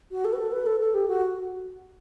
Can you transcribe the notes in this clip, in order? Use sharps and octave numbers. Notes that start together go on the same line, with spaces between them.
F#4
A4
B4
A4
B4
A4
A4
G4
F#4